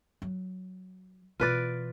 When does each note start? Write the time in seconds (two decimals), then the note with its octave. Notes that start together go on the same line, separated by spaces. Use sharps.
0.22 F#3
1.40 B2 E3 F4 B4 D5